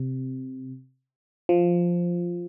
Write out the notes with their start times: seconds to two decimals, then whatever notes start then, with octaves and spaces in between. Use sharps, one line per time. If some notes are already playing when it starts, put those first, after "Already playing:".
Already playing: C3
1.49 F3